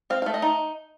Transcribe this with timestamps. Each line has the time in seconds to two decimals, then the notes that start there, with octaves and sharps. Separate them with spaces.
0.10 C4 F5
0.22 F5
0.26 A3
0.34 D#5
0.42 D#4